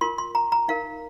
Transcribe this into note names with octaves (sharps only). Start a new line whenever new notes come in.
F4 A#4 C6
C6
A#5
A#5
D#4 A#4 F5